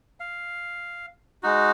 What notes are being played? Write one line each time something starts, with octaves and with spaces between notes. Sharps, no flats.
F5
G#3 D#4 F#4